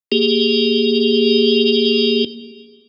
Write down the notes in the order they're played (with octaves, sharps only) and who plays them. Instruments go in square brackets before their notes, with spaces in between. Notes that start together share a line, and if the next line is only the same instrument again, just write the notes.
[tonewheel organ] A#3 G4 G#4